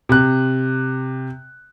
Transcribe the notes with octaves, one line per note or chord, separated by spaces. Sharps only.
C3 F#6